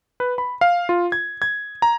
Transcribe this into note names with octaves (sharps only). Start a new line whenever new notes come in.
B4
B5
F5
F4
G#6
G#6
A#5